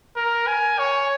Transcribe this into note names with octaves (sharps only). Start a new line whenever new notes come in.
A#4
G#5
C#5